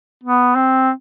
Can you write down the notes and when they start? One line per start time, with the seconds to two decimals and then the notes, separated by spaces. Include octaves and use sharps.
0.24 B3
0.56 C4